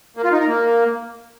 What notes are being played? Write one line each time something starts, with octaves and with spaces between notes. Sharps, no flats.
A#3
F4
D#4
A#4
A#3